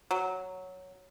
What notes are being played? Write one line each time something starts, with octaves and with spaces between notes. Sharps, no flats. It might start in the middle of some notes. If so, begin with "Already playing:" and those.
F#3